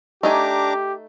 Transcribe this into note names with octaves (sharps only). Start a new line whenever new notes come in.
A3 D4 D#4 G4 G#5 A#5 D6